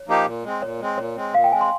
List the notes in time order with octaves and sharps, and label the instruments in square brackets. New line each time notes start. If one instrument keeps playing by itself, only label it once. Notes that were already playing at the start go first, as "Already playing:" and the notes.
Already playing: [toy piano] C#5
[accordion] F3 A#3 D#4 G4
A#2
G#3 C4
[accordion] A#2 [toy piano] C#5
[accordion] G#3 C4
[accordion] A#2 [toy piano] C#5
[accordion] G#3 C4
[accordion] A#2 [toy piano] F5
[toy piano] G5
[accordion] G#3 C4 [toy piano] G#5
[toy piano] C6